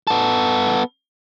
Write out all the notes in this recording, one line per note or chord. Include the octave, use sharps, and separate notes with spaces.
B3 A4